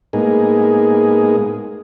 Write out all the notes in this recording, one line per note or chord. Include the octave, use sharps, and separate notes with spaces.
A2 G#3 A#3 B3 D#4 G#4